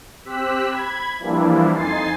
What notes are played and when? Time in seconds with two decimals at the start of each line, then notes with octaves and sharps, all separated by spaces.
0.25 C4 G4 E6 F#6 B6
0.70 B5 G#6
1.19 E3 F3 G3 A#3 D4 E4
1.75 F2 D#4 G#5 C6 A6 C7